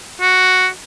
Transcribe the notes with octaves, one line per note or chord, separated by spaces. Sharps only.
F#4